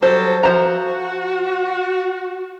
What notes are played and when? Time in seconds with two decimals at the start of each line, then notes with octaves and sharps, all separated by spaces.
0.02 F#3 G3 A4 C5
0.43 F3 F#4 C5 A#5